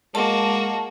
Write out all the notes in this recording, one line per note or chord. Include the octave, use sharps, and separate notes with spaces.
G#3 A#3 F#4 A5